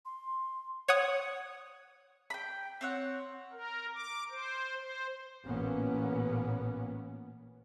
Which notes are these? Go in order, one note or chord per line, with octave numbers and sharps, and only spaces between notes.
C6
C#5 F#5 D#6
G5 B5
C4 C#5 F#5
A#4
D6
C5
C5
A1 A#2 A#3 B3 C#4